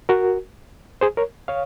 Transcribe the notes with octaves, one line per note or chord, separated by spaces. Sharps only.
F#4 A#4
G#4 C5
A#4 C#5
C#5 F5